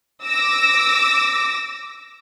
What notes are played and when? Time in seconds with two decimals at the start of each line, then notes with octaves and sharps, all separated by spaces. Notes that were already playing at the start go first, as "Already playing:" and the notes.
0.24 D6 E6 A#6